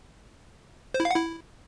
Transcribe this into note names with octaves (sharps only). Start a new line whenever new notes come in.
C5
E4
F5
F#5
E4